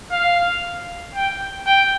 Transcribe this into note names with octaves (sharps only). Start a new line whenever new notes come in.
F5
G5
G5